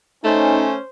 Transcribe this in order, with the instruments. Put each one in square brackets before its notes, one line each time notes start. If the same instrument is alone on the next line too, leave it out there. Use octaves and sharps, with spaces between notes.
[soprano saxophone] A3 [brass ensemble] C#4 [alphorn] D#4 [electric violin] C5